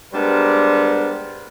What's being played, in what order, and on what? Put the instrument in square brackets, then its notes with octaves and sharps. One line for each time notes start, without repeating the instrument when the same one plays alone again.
[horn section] G3 G#3 B3 D4 A#4 C5